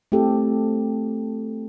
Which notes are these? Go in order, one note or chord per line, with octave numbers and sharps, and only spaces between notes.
A3 C4 E4 G4 A4